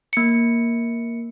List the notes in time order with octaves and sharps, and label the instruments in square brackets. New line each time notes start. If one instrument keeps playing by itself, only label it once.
[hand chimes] A#3 C#7